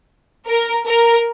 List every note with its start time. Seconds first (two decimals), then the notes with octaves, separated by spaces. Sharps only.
0.47 A#4
0.86 A#4